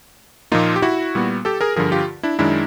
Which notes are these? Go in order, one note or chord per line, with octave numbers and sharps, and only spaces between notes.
A#2 F3 A#3 D#4 F4
G4
E4 F#4
A#2 G3 B3
G4 A4
G#4 A#4
G2 D3 F3 G#4 A#4
F4 G4
D4 E4
F#2 D#3 G#3 D4 E4